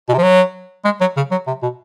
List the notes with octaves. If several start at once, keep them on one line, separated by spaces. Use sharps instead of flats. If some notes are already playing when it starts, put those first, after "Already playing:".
B2
C3
F3
F#3
G#3
F#3
C#3
F#3
C3
B2